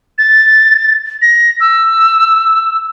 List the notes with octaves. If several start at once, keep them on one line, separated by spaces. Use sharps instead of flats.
A6
A#6
E6